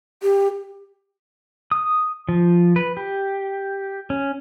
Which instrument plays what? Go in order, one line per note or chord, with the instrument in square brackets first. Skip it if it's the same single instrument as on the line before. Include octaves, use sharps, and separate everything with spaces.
[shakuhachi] G4
[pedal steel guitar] D#6
F3
B4
G4
C#4